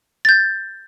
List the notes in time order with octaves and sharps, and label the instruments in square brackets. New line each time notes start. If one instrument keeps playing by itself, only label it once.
[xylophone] G6 A6